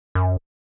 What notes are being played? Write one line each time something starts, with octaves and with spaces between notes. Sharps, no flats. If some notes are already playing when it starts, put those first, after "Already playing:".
F#2